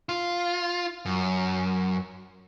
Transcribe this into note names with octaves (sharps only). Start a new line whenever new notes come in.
F4
F#2